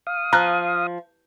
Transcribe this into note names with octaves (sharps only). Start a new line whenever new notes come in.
F5 D#6
F3 A#5 F6 F#6